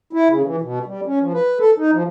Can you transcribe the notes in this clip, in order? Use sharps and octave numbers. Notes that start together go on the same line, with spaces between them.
E4
C#3
E3
B2
G3
C#4
F3
B4
A4
D#4
F3